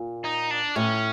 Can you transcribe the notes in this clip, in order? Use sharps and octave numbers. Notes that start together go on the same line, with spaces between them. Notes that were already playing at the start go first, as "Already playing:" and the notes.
Already playing: A#2
D#4
D4
A2 C#4